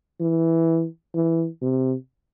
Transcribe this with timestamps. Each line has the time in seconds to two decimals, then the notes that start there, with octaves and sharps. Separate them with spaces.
0.20 E3
1.14 E3
1.62 C3